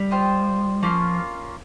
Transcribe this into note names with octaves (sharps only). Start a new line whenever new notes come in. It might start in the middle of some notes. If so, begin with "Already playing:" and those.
Already playing: G3
F4 C5 D#5 G5
F3 A#3 C#4 F4